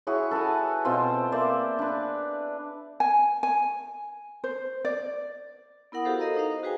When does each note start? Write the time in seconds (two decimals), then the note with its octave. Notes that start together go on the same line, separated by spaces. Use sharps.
0.07 E4 F#4 G#4 C#5
0.31 A4 B4 F#5 G#5
0.85 B2 C4 F4 C5
1.32 A#3 C5 D5 E5
1.79 D4 B4
3.00 G#5
3.43 G#5
4.44 C5
4.85 D5
5.92 B3 E4 A#4 F#5 B5 D#6
6.05 E4 F#4 G4 A4 C5 F5
6.19 A#4 D#5 F5 A#5
6.37 D#4 C5 F5
6.52 D#5
6.63 F#4 G#4 B4 C5 G5 G#5